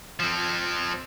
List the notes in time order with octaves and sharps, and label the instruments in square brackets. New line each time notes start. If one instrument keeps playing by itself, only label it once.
[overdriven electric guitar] F3 C4